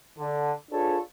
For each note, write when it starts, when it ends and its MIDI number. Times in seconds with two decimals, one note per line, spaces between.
0.18 0.51 50
0.71 0.97 62
0.71 0.97 65
0.71 0.97 68
0.71 0.97 69
0.71 0.97 71
0.71 0.97 73